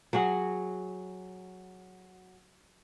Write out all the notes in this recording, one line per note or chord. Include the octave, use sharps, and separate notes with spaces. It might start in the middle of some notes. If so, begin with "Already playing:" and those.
F#3 F#4 G#4 F#5